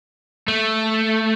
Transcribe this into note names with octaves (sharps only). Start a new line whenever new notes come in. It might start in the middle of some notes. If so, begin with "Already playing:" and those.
A3